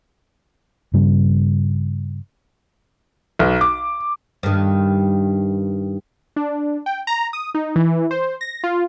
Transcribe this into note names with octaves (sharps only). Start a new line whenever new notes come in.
G2 C#3 G3
B1
D6
G2 D#3
D4
G5
A#5
D#6
D#4
E3
C5
A#6
F4